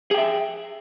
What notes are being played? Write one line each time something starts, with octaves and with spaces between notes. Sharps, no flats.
G#4 E5 G5